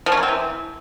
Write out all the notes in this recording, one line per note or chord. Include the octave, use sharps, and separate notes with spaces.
F3
C#4
A#3
C4
E3